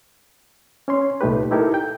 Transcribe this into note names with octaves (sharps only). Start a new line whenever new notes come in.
C#4 C#5 C6
C2 A#2 A3 D#4 G4 B4
D#4 E4 G4 A4 A#4
G5